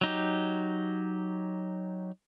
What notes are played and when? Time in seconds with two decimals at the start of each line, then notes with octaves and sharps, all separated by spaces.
0.01 F#3 D#4 G4